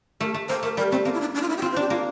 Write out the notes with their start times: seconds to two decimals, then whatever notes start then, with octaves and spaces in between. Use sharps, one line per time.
0.20 A3 A#4
0.34 A3
0.48 A#3 C5
0.63 A3 A#4
0.77 G3 A#4
0.91 A3 C4
1.05 A#3 C4
1.14 E4
1.20 D4
1.35 D4
1.43 F4
1.49 E4
1.58 G4
1.62 C4 F4
1.72 C5
1.76 D4 G4
1.90 A#3 F4